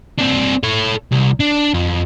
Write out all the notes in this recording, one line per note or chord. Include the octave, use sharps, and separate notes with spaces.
C4 D4
A4 C#5
C2
D4
F2